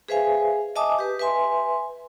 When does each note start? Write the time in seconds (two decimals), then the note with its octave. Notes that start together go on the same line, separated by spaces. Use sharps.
0.08 G#4 B4 C5 E5 F5 G#5
0.76 D#5 E5 G#5 A5 D6 D#6
0.99 G4 B4
1.19 B4 E5 G#5 C6